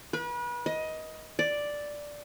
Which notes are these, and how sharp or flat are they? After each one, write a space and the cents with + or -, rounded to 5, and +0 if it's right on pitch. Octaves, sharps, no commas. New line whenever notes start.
B4 -35
D#5 +15
D5 +0